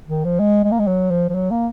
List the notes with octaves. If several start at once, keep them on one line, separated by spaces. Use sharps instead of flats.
D#3
F3
G#3
G#3
A#3
G#3
F#3
F3
F3
F#3
A#3